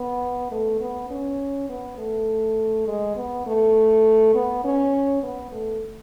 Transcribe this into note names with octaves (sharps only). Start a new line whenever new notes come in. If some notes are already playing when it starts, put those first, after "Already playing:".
Already playing: B3
A3
B3
C#4
B3
A3
G#3
B3
A3
B3
C#4
B3
A3